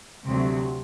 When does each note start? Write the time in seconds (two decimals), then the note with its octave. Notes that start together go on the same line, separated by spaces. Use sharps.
0.27 D2 C3 F#3